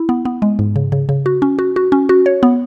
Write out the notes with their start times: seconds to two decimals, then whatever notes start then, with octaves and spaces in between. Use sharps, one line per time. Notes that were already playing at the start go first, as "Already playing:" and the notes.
Already playing: E4
0.09 B3
0.25 B3
0.42 G#3
0.59 G#2
0.76 C#3
0.92 C#3
1.09 C#3
1.26 F#4
1.42 C#4
1.59 F#4
1.76 F#4
1.92 C#4
2.09 F#4
2.26 C#5
2.43 B3